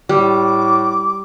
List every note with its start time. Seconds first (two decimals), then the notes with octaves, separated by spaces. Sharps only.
0.09 A2 G3 D6